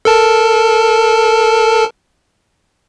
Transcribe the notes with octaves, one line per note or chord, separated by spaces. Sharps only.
A4 A#4 A5